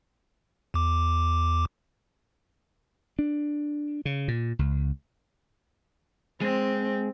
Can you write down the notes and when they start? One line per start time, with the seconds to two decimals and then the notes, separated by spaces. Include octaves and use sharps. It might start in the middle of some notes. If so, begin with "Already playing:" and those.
0.74 E2 D6
3.19 D4
4.05 C#3
4.28 A#2
4.59 C#2
6.41 G#3 C4